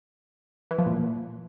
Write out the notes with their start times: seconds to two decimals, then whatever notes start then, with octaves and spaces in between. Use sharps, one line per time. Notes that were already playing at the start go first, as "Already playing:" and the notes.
0.71 E3
0.79 F3
0.86 A#2